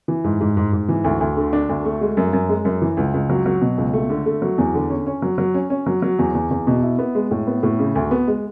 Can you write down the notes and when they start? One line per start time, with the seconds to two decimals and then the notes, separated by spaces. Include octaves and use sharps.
0.08 E3
0.24 G#2
0.41 G#2
0.57 G#2
0.73 G#2
0.89 E3
1.04 D2
1.21 D2
1.37 D3
1.53 D4
1.69 D2
1.85 A3
2.01 G#3
2.17 F#2
2.33 F#2
2.49 G#3
2.65 F#2
2.82 E3
2.97 C#2
3.14 C#2
3.30 F#3
3.46 F#3
3.62 B2
3.78 C#2
3.93 A3
4.10 D3
4.26 A3
4.42 F#3
4.58 E2
4.74 D3
4.90 C#4
5.06 C#4
5.22 F#3
5.38 F#3
5.54 C#4
5.70 C#4
5.86 F#3
6.02 F#3
6.19 E2
6.34 E2
6.51 E2
6.67 B2
6.83 E4
6.99 B3
7.15 G#3
7.31 A2
7.47 B3
7.63 A2
7.79 C#3
7.95 D2
8.11 B3
8.28 G#3